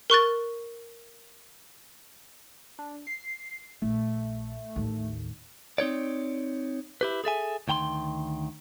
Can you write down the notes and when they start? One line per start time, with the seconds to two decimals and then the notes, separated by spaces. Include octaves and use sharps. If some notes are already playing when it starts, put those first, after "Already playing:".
0.10 A#4 C#6 F#6 A6
2.79 D4
3.07 C7
3.82 A#1 A3
4.76 A1 D#2
5.78 C4 D#4 C#5 D5
7.01 E4 G4 B4
7.24 G#4 A4 E5 G#5
7.68 D2 D#3 G5 A#5 C6